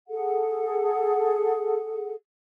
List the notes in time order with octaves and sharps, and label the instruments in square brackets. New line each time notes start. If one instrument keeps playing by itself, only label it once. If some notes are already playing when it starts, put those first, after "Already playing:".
[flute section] G#4 A4 F#5